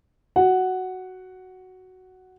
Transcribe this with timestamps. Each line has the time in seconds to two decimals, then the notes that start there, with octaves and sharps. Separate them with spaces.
0.36 F#4 F#5